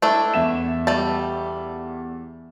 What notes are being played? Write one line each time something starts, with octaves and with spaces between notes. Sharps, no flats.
A3 D4 E4
E2 E5 E7
G3 A3 A5